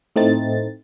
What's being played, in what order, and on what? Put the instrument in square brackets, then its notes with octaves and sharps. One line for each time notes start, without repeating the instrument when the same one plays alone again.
[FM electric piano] A2 A3 C4 D#4 A6